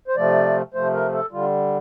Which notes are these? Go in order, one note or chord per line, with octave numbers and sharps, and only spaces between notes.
C5
C3 F3 A3 D5
C3 F3 A3 C5
A#4
A4
D3 G3 F4